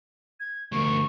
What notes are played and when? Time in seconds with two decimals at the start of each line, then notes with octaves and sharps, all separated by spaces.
0.40 G#6
0.72 D2 A#4 C#6